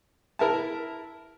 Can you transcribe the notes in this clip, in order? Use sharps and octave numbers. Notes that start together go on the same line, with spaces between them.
E4 A#4 E5 A5